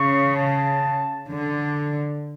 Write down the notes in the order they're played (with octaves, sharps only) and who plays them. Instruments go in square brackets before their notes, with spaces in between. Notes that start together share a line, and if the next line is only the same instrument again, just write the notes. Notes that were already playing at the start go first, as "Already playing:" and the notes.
Already playing: [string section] C#3 [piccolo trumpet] C#6
[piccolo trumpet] A5
[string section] D3